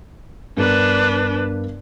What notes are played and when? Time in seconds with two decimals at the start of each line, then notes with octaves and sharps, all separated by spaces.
0.57 G2 B3 D4 A#4 B4